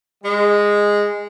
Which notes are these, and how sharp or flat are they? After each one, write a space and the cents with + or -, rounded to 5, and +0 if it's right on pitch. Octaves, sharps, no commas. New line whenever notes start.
G#3 -10